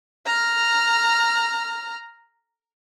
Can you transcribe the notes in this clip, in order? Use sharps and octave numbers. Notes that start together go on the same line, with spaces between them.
A#5 F6